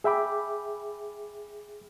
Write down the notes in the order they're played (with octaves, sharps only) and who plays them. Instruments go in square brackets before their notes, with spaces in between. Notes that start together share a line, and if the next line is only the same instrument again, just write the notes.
[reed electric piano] G#4 E5 G5 B5 D6